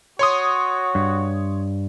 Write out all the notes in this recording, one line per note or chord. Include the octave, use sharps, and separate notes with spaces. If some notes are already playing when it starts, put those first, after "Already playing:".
F#4 C#5 C6 D#6
G2